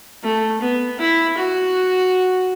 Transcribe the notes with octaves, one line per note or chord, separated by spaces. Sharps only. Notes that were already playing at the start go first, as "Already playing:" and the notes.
A3
B3
E4
F#4